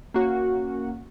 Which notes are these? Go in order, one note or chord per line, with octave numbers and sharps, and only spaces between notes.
A#3 C#4 F#4